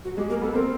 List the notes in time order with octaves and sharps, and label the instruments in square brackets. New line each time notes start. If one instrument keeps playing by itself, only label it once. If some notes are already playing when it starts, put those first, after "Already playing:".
[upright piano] F#3 [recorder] F#4
[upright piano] G#3 [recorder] G4
[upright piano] A#3 [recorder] A#4
[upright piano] B3 [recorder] A4
[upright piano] C4 [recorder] A#4